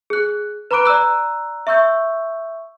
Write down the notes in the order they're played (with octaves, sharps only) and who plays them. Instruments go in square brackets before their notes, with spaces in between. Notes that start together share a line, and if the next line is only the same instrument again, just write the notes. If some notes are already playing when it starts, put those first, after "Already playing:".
[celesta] G#4 F#6
B4 A#5 B5 D6 F#6 D7
D5 A#5 E6 F#6
E5 C#6 E6 G6